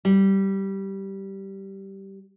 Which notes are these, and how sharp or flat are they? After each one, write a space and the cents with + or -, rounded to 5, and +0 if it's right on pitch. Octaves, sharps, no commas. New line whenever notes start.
G3 -10